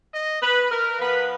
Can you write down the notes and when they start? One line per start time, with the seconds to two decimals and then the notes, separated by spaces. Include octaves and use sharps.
0.13 D#5
0.42 B4
0.71 A#4
0.99 F3 B3 B4